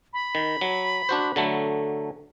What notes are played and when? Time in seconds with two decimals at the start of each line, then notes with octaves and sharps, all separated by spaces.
0.13 B5
0.35 D#3
0.61 F#3
1.09 D4 F#4 C5
1.36 D3 F#3 A3